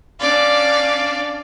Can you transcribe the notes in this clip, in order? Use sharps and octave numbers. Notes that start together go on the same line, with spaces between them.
C#4 D4 D5 F5